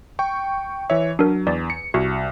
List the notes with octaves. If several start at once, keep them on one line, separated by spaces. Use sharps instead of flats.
G5 C#6
E3 C#5 E5
F#3 D4 A#4
E2 D5
C#7
C2 F#4